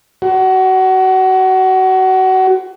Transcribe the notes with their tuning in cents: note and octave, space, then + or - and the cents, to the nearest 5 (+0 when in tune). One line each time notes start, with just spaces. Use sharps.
F#4 +25